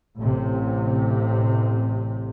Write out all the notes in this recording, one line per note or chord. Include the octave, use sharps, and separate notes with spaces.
A1 C3